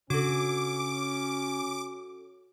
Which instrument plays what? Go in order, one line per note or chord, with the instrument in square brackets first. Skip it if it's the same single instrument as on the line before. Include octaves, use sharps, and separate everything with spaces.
[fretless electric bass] C#3 D4 [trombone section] C#4 [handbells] F#4 A4 [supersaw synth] D6